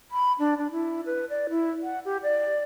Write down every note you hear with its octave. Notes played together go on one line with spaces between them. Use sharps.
B5
D4
D4
E4
B4
D5
E4
F#5
G4
D5